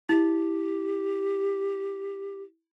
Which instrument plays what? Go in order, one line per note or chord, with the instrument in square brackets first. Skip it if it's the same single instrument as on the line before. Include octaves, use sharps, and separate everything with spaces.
[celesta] E4 [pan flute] G4